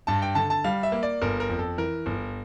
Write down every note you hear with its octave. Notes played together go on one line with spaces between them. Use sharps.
G2 A5
G5
D3 A5
A5
G3 F5
E5
A#3
D5
G1 A#4
A#4
F2
A4
E3 A#4
G1